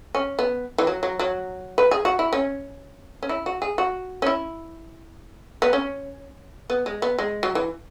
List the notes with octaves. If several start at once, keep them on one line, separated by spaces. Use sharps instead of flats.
C#4
B3
E3
F#3
F#3
F#3
B4
G#4
F#4
E4
C#4
C#4
E4
F#4
G#4
F#4
C#4
E4
B3
C#4
B3
G#3
B3
G#3
F#3
E3